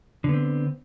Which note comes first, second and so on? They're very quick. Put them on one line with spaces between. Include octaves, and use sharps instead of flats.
D3 B3 C4